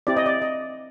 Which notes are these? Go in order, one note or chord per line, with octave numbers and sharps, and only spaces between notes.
C4 E4 G4 D5
D#5
D5
D#5